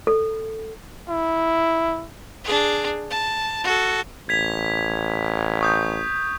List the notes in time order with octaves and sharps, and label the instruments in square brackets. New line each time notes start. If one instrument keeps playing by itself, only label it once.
[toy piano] A4
[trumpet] E4
[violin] D4 G#4
A5
F#4 A4
[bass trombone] A1 [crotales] G#6 B6 F7
[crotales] C#6 D#6 G6